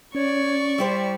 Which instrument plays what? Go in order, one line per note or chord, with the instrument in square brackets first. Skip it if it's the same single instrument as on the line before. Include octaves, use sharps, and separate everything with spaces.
[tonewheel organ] C#4 [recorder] C#5 [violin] D5 C#6
[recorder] G3 [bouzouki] E4 G4 C5